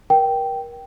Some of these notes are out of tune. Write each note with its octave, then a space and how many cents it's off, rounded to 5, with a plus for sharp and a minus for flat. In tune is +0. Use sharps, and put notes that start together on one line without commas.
A#4 +30 G5 -10